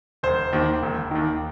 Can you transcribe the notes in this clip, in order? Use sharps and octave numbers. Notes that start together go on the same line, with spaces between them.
E1 C5
D#2 D#3
E1
D#2 D#3